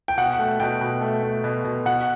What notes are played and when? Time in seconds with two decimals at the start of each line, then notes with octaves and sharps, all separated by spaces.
0.08 G5
0.18 B2 F#5
0.39 A3
0.60 B2 G5
0.81 B2
1.01 A3
1.23 A3
1.44 B2
1.64 B2
1.85 B2 F#5